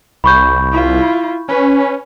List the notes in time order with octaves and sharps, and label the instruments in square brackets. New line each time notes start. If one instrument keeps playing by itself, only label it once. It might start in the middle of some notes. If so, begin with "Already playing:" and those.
[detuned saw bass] C2 [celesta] B5 C#6 G6
[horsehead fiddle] E4 F4
[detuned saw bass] C#4 [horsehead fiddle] B4